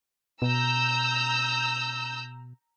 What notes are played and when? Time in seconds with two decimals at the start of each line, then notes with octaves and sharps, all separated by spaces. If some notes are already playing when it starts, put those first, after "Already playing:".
0.42 B2 A#5 E6 G6